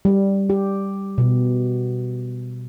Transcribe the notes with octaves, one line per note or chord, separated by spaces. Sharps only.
G3
G4
B2